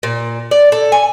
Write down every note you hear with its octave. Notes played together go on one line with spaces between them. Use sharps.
A#2
D5
A4
G#5